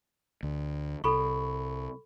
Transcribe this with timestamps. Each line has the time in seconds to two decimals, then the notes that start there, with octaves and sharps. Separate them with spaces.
0.43 D2
1.04 C2 A4 B5 C#6